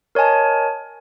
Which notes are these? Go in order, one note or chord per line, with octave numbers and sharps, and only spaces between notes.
A#4 C#5 D#5 G#5 A5